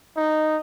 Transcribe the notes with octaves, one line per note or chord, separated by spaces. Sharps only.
D#4